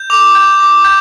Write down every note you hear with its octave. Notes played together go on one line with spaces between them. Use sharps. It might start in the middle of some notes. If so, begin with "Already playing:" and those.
Already playing: G6
D6 F7
G6
D6
G6